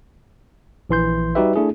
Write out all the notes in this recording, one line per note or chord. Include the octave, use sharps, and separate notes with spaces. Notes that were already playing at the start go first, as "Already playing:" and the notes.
A#1 E3 C6 G6
G3 D#4 F#4 G4 B4 E5
A3 D4 E4 G#4